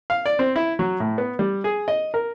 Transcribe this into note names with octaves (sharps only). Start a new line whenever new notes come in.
F5
D5
C4
E4
F#3
A2
B3
G3
G#4
D#5
A#4